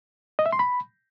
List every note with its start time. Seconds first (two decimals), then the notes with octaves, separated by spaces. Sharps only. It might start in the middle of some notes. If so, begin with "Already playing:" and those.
0.39 D#5
0.46 E5
0.53 C6
0.59 B5